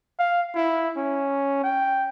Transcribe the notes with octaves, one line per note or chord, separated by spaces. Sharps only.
F5
E4
C#4
G5